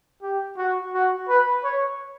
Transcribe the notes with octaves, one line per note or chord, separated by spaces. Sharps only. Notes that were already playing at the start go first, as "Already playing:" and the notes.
G4
F#4
F#4
B4
C#5